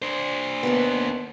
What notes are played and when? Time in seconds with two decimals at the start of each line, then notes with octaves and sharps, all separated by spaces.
0.02 D4 C5
0.63 D#2 A#3 B3